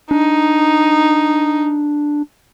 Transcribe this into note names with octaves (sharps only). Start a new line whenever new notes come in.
D4 D#4